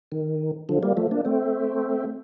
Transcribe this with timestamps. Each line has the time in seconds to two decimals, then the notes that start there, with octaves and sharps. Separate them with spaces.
0.12 D#3
0.69 D3 F3
0.83 G3 A#3
0.97 F3 A3
1.11 A#3 D4
1.25 A3 C4